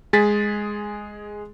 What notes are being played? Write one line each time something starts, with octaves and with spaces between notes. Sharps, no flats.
G#3 G#4 A6 B6